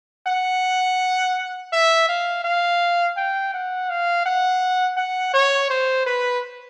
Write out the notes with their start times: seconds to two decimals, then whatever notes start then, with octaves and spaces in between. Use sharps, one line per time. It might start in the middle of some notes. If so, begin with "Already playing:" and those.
0.27 F#5
1.72 E5
2.09 F5
2.44 F5
3.17 G5
3.54 F#5
3.90 F5
4.26 F#5
4.97 F#5
5.34 C#5
5.70 C5
6.06 B4